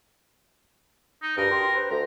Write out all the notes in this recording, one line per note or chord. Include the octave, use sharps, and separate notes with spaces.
D#4
D2 G2 A#4
G4 C6
B4 C5
D2 A#5